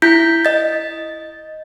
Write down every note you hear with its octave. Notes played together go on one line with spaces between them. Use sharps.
E4 G6 B6
D#5 A6